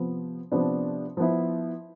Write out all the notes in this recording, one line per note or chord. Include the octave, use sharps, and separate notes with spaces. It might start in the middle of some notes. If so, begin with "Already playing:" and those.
Already playing: C3 F3 B3
C3 F3 B3 D4
F3 B3 E4